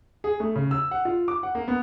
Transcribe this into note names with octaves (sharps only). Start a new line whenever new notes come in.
G#4
A3
C#3
E6
F#5
F4
D6
F#5
A#3
B3